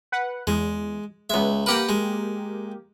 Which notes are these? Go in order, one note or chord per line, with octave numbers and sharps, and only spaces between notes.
B4 F#5
E2 G#3
C#2 G#3 B3 E5
A#3 G4 A#4 B4 F#5 G5
G#3